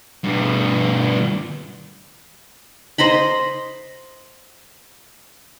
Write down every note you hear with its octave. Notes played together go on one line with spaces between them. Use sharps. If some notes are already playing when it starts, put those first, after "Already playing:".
G2 B2
C5 D#5 A#5 B5